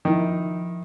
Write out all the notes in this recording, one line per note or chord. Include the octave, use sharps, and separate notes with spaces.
D#3 F3 E4